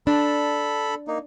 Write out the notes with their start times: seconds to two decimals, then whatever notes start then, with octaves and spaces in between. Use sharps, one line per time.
0.07 D4 A4 B5
1.08 A#3 D#4